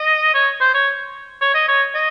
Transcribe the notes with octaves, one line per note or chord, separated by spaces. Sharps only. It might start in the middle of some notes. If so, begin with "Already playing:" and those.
Already playing: D#5
C#5
C5
C#5
C#5
D#5
C#5
D#5